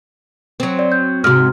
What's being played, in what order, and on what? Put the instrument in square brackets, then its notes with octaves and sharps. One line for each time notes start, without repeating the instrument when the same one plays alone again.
[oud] F#3 C4
[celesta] D5
G6
[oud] G#2 C3 [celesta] F#4 F6